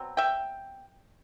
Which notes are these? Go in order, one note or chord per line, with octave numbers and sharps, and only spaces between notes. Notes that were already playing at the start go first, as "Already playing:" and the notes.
Already playing: B2 F#3 C4
E5 G5